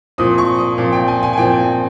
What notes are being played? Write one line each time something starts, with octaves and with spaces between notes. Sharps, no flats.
A#2 F3 C4 D#6
C#6
D#6
A#2 F3 C4 F5
G5
G#5
G#5
G#5
A#2 F3 C4 G5